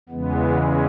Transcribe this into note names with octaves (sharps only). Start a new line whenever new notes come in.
E2 C#3 E3 G#3 B3
C#4